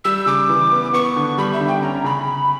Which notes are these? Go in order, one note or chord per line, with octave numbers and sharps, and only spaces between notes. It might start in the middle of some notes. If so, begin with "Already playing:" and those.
G3 E6
C#3 D6
E3
B3
B3 C#6
D3
G3 B5
E5
D3
G5
C#4 A#5
C#3 B5